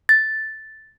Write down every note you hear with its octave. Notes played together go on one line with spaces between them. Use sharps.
A6